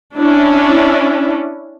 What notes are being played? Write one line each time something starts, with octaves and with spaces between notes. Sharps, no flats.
C#4 D4 E4